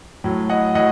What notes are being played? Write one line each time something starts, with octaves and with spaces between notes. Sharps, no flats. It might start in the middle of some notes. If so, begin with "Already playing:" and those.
A2 F#3
D#5 F#5
A2 D#5 F#5